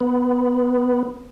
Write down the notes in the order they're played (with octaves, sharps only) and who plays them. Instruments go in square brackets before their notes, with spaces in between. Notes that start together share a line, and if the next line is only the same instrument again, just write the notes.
[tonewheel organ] B3